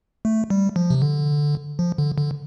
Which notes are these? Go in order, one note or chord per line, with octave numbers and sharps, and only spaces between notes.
A3
G3
F3
C3
D3
F3
D3
D3